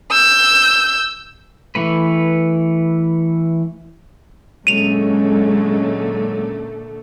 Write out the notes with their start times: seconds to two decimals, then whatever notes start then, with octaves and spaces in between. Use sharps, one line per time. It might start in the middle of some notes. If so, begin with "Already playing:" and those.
0.11 E6 G6
1.75 E3 A3 B4
4.67 A#2 D3 F#3 G#3 A3 C#4 D#7 F7